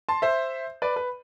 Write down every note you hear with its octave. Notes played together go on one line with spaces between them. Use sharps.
A5 C6
C5 E5
B4 D5
B4